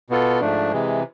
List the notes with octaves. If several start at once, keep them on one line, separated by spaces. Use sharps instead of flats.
B2 B3 F4 A4
G#2 F3 A3 D4
C3 E3 G#3